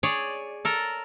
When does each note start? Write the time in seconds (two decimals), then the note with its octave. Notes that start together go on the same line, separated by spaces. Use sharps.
0.03 G#4 C#5 D5
0.65 A4 A#4